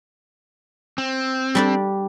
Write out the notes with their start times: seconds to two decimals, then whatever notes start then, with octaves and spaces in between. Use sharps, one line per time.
0.98 C4
1.55 G3 D4 D5